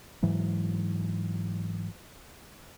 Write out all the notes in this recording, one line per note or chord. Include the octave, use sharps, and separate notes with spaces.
G#2 E3 F#3